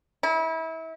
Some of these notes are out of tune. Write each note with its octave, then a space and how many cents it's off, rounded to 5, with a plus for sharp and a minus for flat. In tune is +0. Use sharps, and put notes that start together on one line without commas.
E4 -30